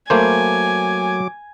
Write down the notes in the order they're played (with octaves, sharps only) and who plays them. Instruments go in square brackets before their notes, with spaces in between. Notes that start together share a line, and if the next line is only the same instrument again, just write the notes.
[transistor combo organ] F#3 D6 [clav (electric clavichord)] A3 A#3 C5 [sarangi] G#5